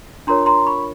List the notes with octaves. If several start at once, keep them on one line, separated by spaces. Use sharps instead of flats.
D4 F4 A#4 C#5 A#5 C6
A#5 C6
B5 C#6